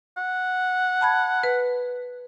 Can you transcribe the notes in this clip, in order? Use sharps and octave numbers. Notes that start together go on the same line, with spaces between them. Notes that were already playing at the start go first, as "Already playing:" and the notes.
F#5
A5 B5 G#6
B4